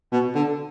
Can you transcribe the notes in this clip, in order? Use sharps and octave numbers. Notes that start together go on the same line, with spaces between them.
B2
D3